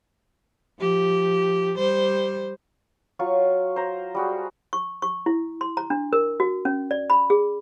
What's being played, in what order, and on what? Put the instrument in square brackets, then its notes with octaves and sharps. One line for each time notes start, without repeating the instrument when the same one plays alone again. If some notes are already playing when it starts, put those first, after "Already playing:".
[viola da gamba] F3 G4
G3 C5
[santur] F#3 F4 C#6
C5 A#5
G3 F#4 G#4
[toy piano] C#6
C#6
E4
C6
A#5
D4
A#4
F#4
C#4
D5
B5
G#4